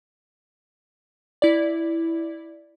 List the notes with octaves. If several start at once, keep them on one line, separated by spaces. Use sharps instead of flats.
E4 D5